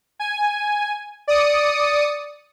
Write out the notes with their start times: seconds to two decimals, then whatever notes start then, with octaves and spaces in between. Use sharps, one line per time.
0.20 G#5
1.28 D5 D#6 C#7